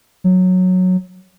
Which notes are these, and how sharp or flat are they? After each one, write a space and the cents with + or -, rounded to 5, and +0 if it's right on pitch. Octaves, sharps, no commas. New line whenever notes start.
F#3 -10